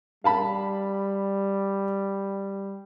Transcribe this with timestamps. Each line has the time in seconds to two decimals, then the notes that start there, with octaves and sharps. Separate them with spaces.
0.24 G3 F5 A5 B5